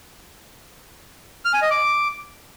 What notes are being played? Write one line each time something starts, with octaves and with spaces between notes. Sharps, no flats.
F6
G#5
D#5
D6